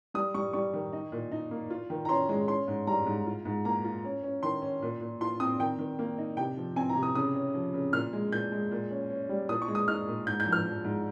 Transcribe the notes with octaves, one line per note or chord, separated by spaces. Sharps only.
G3 D#6
G3 C#6
G3 C#6
D#3
D#4
A#2
D#4
A#3
F4
D#3
A#5
C#4 C6
G#3
C#4 C6
G#2
G3 A#5
G#2
F4
G#2
A#3 A#5
F4
C#4
C#4
D#3 C6
C#4
A#2
A#2
F4 C6
C4 D#6
D#3 G5
D#3
A#3
D#4
C3 G5
F3
C4 G#5
A#5
C3
D#6
C#3 D#6
C#4
F3
C#3
A#2 F6
G#3
A#2 G6
G#3
A#2
C#4
C#4
G3
A#2 D#6
C#6
G#3
D#6
D#4 F6
A#2
G#2 G6
G6
F3
F6
F3
G#2